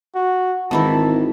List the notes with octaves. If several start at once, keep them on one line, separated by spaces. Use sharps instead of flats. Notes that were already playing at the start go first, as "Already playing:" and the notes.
F#4
G#1 D#3 E3 E4 A5